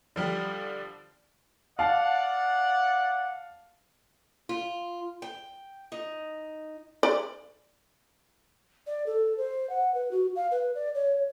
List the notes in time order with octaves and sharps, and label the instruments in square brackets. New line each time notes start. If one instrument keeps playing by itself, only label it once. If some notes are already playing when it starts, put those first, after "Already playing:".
[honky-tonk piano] D3 F3 G3
[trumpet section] D5 F#5 [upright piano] F5 A5
[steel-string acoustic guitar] F4
G5
D#4
[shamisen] D5
[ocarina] D5
A4
C5
F#5
B4
F#4
F5
B4
D5
C#5